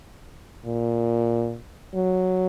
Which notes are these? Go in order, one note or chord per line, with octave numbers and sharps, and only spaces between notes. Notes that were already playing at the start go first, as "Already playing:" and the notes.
A#2
F#3